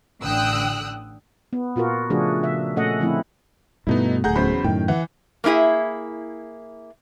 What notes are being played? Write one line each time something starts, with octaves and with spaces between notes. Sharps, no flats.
A1 D3 G5 D#6 E6 F#6
B3
A#2 F4 F#4 A#4
C#3 F3 A3 D4 F#4 G#4
C#3 E5
A#2 A3 C#4 A4 D#5 F#5
D3 F3 A3 C4 E4
G2 B2 A3 B3 D#4 E4
D1 G#1 A3 G#4 F#5 A#5 G6
E2 C#3 F#3 C5 B5
F#2 A2 D#3 G5
E3 F#5
A#3 C#4 E4 G#4 E5